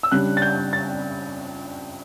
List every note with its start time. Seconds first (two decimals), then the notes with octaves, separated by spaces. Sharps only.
0.03 E6
0.12 C#3 G3 D4 F#6
0.37 A6
0.42 G6
0.73 A6